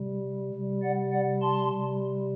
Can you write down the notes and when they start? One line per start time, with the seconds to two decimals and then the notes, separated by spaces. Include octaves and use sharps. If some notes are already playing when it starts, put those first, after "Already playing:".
Already playing: C3 G3
0.54 C3 G3
0.82 D5 F#5
1.11 D5 F#5
1.41 A5 C6
1.70 C3 G3